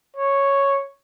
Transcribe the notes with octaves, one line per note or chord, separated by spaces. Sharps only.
C#5